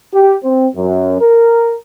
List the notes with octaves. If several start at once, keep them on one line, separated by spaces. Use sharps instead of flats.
G4
C4
F#2
A#4